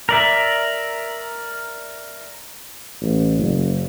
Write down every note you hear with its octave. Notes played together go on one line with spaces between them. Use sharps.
A#4 D5 E5
A1
F#1